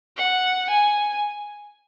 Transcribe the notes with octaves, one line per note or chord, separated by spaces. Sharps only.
F#5
G#5